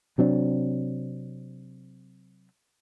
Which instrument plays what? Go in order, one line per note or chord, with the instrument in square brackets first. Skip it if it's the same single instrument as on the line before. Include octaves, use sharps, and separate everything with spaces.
[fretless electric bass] C3 F#3 C4 D4